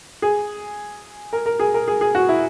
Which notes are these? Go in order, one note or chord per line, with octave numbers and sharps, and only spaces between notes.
G#4
A#4
A#4
G#4
A#4
G#4
G#4
F#4
E4